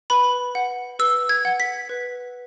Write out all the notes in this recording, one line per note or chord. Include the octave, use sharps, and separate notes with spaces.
B4 B5
F#5
B4 E6
G#6
F#5
B6
B4